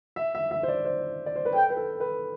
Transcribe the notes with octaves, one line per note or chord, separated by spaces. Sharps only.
E5
E5
E5
C5
D5
C5
D5
C5
B4
A4 G5
B4
A4
B4